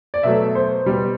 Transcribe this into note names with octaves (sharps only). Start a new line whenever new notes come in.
D5
B2 F#3 A3 E5
C5
B2 G3